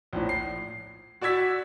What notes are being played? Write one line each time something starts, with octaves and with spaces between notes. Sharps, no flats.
A#1 A2
C7
F#4 D5 E6 G#6 B6